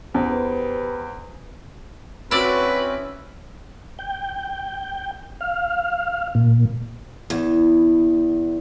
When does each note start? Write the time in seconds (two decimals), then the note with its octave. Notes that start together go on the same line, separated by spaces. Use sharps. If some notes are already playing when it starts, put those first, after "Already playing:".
0.14 E2 G4 B4 C5
2.31 C4 C#4 E4 F#4 B4 D5
3.99 G5
5.41 F5
6.35 A#2
7.30 E2